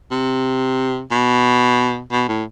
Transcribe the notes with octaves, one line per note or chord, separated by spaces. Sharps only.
C3
B2
B2
A2